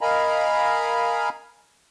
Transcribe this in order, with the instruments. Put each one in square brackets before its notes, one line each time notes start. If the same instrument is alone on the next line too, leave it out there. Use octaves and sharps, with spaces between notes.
[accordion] A#4 D#5 F5 G#5 A#5 B5